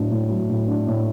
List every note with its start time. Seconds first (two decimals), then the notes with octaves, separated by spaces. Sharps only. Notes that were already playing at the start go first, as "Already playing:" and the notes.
Already playing: A2 F#3 D4
0.11 A2
0.29 F#3
0.50 A2
0.68 D4
0.87 A2